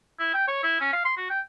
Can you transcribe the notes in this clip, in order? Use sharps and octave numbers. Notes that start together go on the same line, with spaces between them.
E4
G5
C#5
E4
C#4
F5
C6
F#4
G5